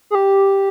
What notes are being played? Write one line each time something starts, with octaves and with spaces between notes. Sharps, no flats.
G#4
G4